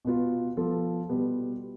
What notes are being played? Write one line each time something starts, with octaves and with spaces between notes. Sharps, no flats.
B2 B3 F4
F3 B3 F4 A4
B2 G3 B3